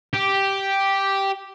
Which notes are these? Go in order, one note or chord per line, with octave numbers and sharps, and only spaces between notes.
G4